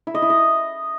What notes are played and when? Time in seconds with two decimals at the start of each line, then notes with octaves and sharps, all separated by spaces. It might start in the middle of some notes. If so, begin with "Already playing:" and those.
0.07 E4
0.15 D#5
0.22 E4
0.30 D#5